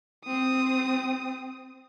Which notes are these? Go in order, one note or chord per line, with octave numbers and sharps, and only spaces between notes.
C4 D#6